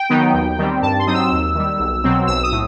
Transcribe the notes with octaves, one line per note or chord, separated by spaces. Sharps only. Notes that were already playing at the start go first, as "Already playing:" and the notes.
Already playing: G5
D#3 F#3 B3 D#4
D#2
D#3 G3 C4
G2 A5
C6
F#3 C4 D#4 D#6
E6
D#2
D#3 G3
B1
B2 F#3 C4
B1 E6
D#6
A2